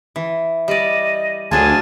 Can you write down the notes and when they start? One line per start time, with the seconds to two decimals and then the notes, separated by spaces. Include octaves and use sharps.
0.16 E3
0.68 G3 D5 D#5
1.51 D2 F#3 D4 F4 G#4 G#5 A5